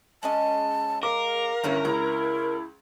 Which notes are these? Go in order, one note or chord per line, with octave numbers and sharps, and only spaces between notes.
G#3 C#4 D#5 A5
A#4 F5 D6
G1 D#3 A#3 C#4 E4 B4
C#2 E4 A#5